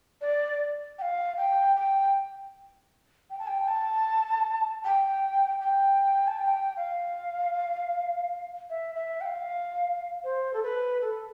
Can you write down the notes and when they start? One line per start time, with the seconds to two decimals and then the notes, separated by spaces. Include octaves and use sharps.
0.21 D5
0.98 G5
1.02 F5
1.37 G5
1.76 G5
3.30 G5
3.39 A5
3.47 G5
3.68 A5
4.84 G5
5.61 G5
6.27 A5
6.38 G5
6.77 F5
8.70 E5
8.95 E5
9.21 G5
9.25 F5
10.24 C5
10.53 A4
10.63 B4
11.02 A4